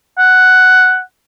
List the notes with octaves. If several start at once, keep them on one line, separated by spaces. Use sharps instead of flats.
F#5